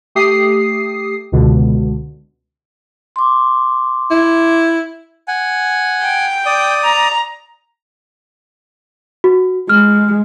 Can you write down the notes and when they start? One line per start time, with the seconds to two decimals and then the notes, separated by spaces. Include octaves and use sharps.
0.15 A3 G4 D#6 C7
1.32 C#2 B2 D3
3.16 C6 D6
4.11 E4
5.28 F#5 G#5
6.02 G5
6.46 D5 D#6
6.84 A#5
9.24 F#4
9.69 G#3 F6